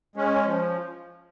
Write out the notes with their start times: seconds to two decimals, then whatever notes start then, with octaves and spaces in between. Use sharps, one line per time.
0.16 G#3 C#4
0.46 F3